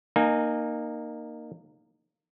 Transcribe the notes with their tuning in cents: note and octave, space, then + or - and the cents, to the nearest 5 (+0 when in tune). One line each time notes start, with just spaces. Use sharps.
A#3 +0 D#4 -25 G#5 +0